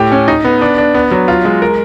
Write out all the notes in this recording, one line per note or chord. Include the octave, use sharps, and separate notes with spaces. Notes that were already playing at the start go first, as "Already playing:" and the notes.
Already playing: A2 G4
C#4
D#4
B3
D4
D4
B3
F#3
F4
G#3
A#4